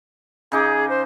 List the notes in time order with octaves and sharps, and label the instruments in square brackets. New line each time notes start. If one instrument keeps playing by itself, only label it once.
[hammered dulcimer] C#3 D#4 D6 [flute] G#4
[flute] C5